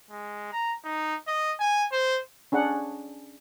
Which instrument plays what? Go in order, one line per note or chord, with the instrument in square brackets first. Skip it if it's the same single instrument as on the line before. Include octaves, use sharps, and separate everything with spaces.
[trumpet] G#3
A#5
D#4
D#5
G#5
C5
[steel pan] C#4 D4 G#4 F#5